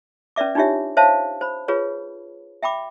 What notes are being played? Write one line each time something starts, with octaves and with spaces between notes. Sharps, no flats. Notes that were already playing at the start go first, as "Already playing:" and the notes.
C#4 B4 D5 E5 D6
D4 D#4 F4 G4 C#5 E5
C5 C#5 E5 F5 A5
C5 B5
F4 G#4 B4 C#5
E5 G5 B5 D6